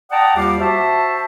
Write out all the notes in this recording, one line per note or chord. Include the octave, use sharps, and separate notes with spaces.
D5 F#5 G5 A5 A#5 D#6
D#2 G3 F4 G4 F5 D6
F#4 C5 E5 A5